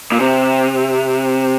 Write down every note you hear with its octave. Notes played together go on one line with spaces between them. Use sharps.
A#2
C3